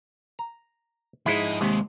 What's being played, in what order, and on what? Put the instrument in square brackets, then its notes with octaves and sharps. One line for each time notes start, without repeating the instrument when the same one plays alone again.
[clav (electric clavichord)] A#5
[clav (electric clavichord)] G#2 G#3 E4 [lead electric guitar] F3 D#5
[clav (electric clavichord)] D#2 C3 [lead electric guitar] G#3